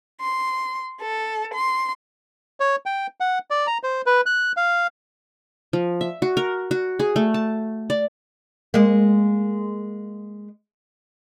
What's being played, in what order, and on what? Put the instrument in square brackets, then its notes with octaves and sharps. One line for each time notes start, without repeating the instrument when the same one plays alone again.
[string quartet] C6
A4
C6
[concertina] C#5
G5
F#5
D5
A#5
C5
B4
F#6
F5
[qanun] F3
E5
F#4
A#4
F#4
G#4
A3
A5
D5
[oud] G#3 A#3